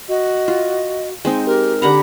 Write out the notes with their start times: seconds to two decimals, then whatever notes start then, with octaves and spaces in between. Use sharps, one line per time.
0.08 F#4 D#5
0.48 F4
1.25 G#3 C4 D#4
1.46 G4 A#4
1.82 D3 G4 F#5 A#5 B5